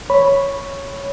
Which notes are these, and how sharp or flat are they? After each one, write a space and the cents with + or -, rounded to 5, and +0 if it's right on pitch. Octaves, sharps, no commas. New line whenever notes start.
C#5 +0 B5 +0